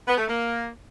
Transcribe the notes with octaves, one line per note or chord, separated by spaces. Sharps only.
B3
A3
A#3